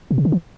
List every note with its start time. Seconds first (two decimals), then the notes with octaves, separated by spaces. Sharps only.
0.11 B2
0.18 C3
0.25 D3
0.32 E3